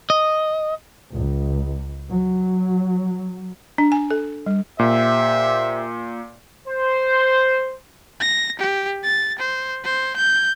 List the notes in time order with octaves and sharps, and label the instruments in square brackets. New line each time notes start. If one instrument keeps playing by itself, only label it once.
[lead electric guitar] D#5
[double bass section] C#2
F#3
[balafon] D4
G#5
A4
G3
[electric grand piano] A#2 [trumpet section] G4 C5 E5
[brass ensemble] C5
[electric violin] A#6
G4
A6
C5
C5
G6